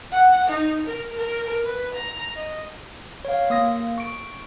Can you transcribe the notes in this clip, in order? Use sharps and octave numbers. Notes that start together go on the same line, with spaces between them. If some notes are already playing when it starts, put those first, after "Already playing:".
F#5
D#4
A#4
A#4
B4
A#5
D#5
C#5 F5
A#3 D#6 A#6
C#6 D7